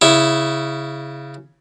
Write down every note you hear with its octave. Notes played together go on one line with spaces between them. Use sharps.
C#3 E4